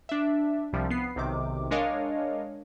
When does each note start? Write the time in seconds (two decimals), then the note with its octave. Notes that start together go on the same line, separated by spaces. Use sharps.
0.09 D4 E5
0.73 C2 C3 F3 G3
0.90 B3 C7
1.16 B1 C3 D#3 D6
1.71 G#3 D4 A#4 C#5 D#5 F5